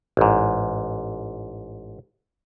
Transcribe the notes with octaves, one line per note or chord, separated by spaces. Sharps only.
A1 G#2